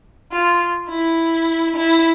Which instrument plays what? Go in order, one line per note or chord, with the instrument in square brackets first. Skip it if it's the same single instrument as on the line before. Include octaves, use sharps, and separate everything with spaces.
[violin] F4
E4
E4